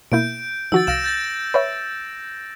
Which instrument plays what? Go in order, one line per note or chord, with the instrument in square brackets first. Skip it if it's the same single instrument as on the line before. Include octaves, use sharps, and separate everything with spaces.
[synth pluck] B2 A#3 E4 [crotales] G6 D7
[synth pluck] D#3 F3 F#4 [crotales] E6 A6
[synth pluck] C2 F5 [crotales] A#6 D7 E7
[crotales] G6 A6 A#6
[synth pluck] B4 C#5 E5